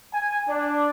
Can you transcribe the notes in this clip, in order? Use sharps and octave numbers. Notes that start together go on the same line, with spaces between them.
G#5
D4